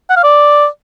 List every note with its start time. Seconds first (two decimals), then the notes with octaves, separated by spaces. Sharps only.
0.10 F#5
0.17 F5
0.24 D5